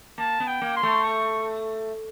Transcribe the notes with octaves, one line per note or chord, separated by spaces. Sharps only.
A#3 A5
B3
G5
A#3
C6
A3
C#6